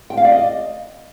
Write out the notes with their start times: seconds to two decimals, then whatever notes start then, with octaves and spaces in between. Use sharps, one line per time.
0.10 G5
0.17 F5
0.25 D5
0.32 D#5